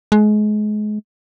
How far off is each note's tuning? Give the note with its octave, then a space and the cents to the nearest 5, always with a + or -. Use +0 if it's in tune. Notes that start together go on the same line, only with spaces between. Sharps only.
G#3 +30